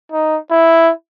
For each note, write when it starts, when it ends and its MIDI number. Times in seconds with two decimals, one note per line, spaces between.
0.12 0.38 63
0.51 0.91 64